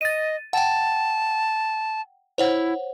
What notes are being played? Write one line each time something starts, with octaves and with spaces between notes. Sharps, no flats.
D#5 A6 D#7
F#5 G5 A5
E4 C5 C#5 F#5